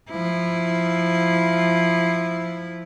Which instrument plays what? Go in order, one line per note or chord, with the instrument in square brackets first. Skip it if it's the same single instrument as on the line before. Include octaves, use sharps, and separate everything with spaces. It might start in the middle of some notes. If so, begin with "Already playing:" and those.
[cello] F3 E4